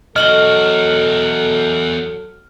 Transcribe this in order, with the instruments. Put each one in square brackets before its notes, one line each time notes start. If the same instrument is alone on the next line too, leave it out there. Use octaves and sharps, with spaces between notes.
[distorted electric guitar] E2 F#4 [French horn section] F#3 A4 [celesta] D#5 F#7 G7 [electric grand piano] F6